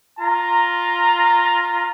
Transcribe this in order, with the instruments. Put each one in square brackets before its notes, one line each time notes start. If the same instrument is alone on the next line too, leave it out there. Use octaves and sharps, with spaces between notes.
[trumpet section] F4 A#5